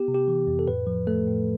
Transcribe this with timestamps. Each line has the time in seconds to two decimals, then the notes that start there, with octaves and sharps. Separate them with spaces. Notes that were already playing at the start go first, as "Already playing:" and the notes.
Already playing: B3 G4
0.08 C3
0.14 G4
0.28 E3
0.47 F2
0.59 A4
0.67 A2 B4
0.87 F3
1.07 A3 A4
1.27 A2